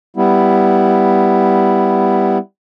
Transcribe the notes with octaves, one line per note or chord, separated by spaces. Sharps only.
G3 B3 E4